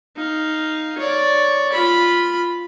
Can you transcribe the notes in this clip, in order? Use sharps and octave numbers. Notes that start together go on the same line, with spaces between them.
D#4 F5
C#5 D5
F4 B5